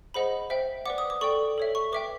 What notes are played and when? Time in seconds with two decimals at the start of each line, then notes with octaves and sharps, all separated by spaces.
0.14 G#4 C5 D#5 F#5 B5
0.50 C5 E5 G5
0.86 B4 D5 F#5 D6
0.98 D#6
1.10 D6
1.21 A4 D5 G5 C#6
1.58 A4 C#5 E5
1.75 C#6
1.92 B4 E5 G5 D6